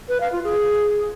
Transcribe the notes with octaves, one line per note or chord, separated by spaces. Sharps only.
B4
F5
F4
G#4